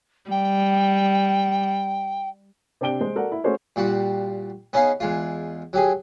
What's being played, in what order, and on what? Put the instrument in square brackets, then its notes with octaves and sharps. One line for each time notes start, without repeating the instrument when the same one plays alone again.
[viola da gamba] G3 [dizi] G5
[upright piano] C3 C4 D4 G5 D7 G7
G#3 C5
F#4 A4 A#4 D5 F#5
E4
A3 C#4 F#4 G#4 C5 C#5
[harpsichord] A#2 G3 F#4
B3 C#4 D#4 G#4 F5
E2 G#3 F4
F#3 G4 G#4